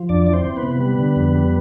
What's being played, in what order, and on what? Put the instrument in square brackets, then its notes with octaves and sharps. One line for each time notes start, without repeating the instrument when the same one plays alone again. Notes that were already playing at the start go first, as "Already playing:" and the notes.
Already playing: [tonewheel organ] F3
F2 D4 D5
E3 D5
C4 C5
E3
B3 B4
C3
G3
D3
F2
G3